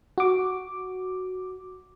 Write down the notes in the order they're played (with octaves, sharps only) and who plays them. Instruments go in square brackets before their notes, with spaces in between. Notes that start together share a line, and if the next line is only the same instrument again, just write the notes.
[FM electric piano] F#4 D6